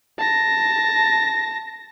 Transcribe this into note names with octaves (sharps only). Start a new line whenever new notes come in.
A5 A#6